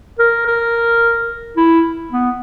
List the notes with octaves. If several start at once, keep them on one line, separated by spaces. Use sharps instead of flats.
A#4
A#4
E4
B3